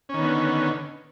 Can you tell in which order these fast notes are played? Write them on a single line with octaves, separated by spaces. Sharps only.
C#4 D#3 B3 D3